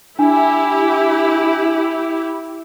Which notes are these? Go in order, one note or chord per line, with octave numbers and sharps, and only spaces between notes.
D4 E4 G4 G#5